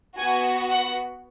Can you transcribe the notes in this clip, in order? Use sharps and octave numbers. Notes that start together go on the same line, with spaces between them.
B3 F#4 G#5
F#5